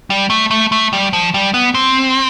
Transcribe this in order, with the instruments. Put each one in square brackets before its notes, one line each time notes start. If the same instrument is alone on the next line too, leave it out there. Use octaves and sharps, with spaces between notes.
[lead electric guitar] G3
A3
A3
A3
G3
F3
G3
B3
C4